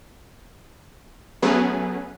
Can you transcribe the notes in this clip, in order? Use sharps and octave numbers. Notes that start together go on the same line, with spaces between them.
F#3 A3 B3 C#4 G#4 B4